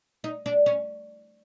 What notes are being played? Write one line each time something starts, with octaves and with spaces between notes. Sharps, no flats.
D#4
D4
C#4